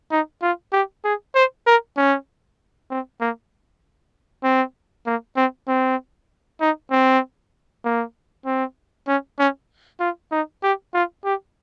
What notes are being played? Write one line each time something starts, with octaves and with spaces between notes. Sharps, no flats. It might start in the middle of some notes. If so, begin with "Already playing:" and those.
D#4
F4
G4
G#4
C5
A#4
C#4
C4
A#3
C4
A#3
C4
C4
D#4
C4
A#3
C4
C#4
C#4
F4
D#4
G4
F4
G4